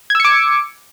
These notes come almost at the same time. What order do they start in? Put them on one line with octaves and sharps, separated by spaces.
G#6 E6 C#7 D6